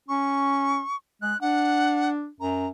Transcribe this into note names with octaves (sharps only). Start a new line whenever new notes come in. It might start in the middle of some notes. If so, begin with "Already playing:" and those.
C#4 C#6
G#3 F#6
D4 F#5
F#2 A#5